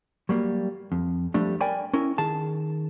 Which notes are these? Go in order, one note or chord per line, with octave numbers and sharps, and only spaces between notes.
F#3 G3 A#3
F2
F3 G3 A3 D4
A#4 D5 G5 G#5 B5
C#4 E4 A#4
D#3 G#4 A5